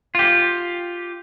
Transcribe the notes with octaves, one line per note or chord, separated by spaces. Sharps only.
F4 G4